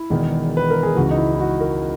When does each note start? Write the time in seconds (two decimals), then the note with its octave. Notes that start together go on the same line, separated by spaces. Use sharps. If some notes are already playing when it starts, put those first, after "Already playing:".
Already playing: E4
0.10 E1 E2 D#3
0.57 B4
0.70 A#4
0.83 G#4
0.95 C#2 C#3 E3 F#4
1.11 D#4
1.17 E4
1.35 E4
1.40 F#4
1.60 A#4